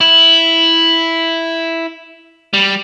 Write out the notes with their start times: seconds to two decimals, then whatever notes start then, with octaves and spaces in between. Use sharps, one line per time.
0.01 E4
2.53 G3